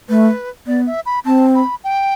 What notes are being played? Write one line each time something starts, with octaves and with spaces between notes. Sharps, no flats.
A3 B4
B3 D5
E5
B5
C4 A5
B5
G5